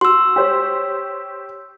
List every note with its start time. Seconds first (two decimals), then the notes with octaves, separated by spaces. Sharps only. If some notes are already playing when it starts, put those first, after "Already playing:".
0.01 F#4 C6 E6
0.36 G4 C5 C#5